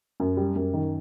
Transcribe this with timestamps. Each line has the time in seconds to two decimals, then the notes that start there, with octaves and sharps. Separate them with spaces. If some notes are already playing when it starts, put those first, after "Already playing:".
0.20 F#2
0.37 G3
0.56 F#2
0.73 D#3